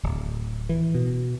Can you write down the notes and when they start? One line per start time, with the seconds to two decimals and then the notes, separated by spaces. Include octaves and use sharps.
0.03 D1
0.69 E3
0.94 B2